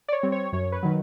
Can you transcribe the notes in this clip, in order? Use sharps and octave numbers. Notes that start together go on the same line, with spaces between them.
D5
C#5
G3 C4
C#5
F#2 C#5
B4
D#3 F#3